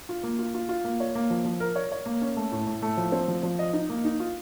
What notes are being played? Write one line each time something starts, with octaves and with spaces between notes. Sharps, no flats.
F4
A#3
F4
F4
F4
A#3
C#5
A#3
F3
F3
A#4
C#5
C#5
A#3
C#4
A3
A2
A2
A3
F3
C4
F3
F3
D#5
D#4
A#3
D#4
F4